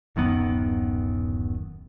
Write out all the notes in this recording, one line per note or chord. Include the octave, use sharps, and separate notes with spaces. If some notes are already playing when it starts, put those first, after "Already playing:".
D1 F#2 D#3 B3